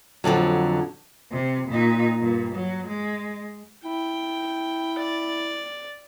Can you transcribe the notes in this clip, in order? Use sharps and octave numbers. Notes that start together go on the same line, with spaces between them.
F2 A2 D3 F#3
C3
A#2 D#4
G2 A#2
F#3
G#3
E4 G5
D5